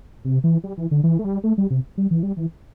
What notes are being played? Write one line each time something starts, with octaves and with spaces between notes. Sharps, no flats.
C3
E3
G3
E3
D3
E3
A3
G3
A3
G3
C3
G3
E3
G3
E3